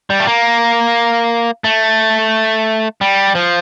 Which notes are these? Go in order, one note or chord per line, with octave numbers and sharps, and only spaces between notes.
G3
A3
A#3
A3
G3
F3